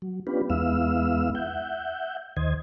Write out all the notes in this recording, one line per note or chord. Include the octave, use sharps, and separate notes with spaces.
F#3
B3 C#4 D4 F4 G4 B4
E2 G#3 B3 E4 F5 E6
E5 F#5 G6
D#2 D#3 C5 D#5 G#6